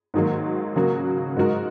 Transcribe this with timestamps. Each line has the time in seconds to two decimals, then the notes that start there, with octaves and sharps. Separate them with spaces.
0.14 G#2 D#3 F#3 A#3
0.76 C#3 F#3 A#3 F#4 A#4
1.36 G#2 G#3 D#4 F#4 A#4